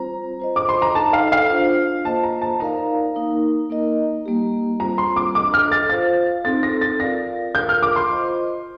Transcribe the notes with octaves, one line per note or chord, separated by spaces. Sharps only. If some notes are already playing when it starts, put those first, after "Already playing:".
Already playing: G3 C4 F4 C5 A#5
F4 C5 D#5
D6
C6
A#5
D#4 A4 D#5 A5
F5
F5
D4 F4 C5
A#3 F4 C5 D#5 A5
A#5
A5
D#4 A#4 D5 F5 A#5
A#3 D#4 A#4
A#3 D#4 A#4 D#5
G3 A#3 D#4 G4
G3 C4 F4 C5 A#5
C6
D6
D4 A4 D#5 D6
F6
A6
F4 C5 F5 A6
C4 D#4 A4 A6
A#6
A6
F4 A#4 D5 F5 A#6
F4 A#4 F5 G6
F6
D6
C6
F4 C5 D#5